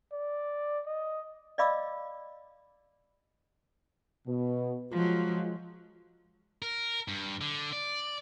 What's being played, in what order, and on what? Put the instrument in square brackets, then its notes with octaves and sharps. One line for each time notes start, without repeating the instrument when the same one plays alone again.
[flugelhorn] D5
D#5
[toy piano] D5 D#5 F5 B5 D6 E6
[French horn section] B2
[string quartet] F3 F#3 [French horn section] G#3 F4
[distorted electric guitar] A#4
G2
D3
D5